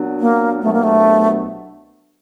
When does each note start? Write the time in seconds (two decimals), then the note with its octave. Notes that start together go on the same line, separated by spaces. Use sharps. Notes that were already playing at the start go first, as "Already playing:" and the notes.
Already playing: A#2 F#3 B3 D4
0.20 A#3
0.62 C2 B2 F#3 A3 B3 D4
0.73 A#3
0.84 A3